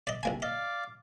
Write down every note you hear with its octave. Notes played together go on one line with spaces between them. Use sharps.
D5 D#5
C2 A#3 G#5
D5 D#5 F5 D6